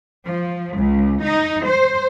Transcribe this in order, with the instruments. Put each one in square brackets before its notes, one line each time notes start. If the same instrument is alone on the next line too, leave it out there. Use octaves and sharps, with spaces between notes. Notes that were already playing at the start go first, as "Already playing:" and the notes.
[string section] F3
C#2
D#4
C5